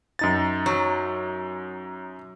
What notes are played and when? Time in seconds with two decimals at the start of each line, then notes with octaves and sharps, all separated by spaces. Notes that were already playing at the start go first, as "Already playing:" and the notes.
0.19 F#2 D#4 A6
0.66 F#3